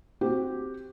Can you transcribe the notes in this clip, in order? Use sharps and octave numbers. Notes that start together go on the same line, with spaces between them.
C4 F#4 G4